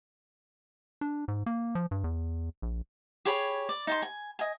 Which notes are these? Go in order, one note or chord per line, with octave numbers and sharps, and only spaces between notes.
D4
G#2
A#3
F3
G2
E2
A#1
G4 G#4 C#5 B5
D5
D#4 A5 C6
G#5
D#5 G#5